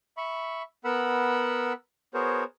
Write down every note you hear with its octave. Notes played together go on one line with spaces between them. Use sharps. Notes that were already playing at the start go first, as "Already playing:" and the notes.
E5 B5 C#6
B3 A#4 F#5 B5 E6
B3 F#4 G#4 A#4 C5 C#5